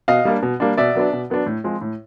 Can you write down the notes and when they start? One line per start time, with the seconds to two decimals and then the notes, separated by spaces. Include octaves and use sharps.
0.08 B2 D#5 F5
0.25 G3 A#3 D4
0.42 B2
0.60 G3 A#3 D4
0.77 B2 D5 E5
0.95 F#3 B3 D4
1.13 B2
1.30 F#3 B3 D4
1.46 A2
1.64 F3 G#3 C4
1.81 A2